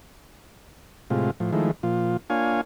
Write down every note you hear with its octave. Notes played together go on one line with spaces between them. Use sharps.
A2 C3 G#3 F4
A2 F3
D#3 F3 G#3 A3 E4
A#2 F3 F4
A#3 D4 F4 C#5 F5 G#5